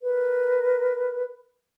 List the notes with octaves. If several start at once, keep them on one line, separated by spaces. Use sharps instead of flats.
A#4 B4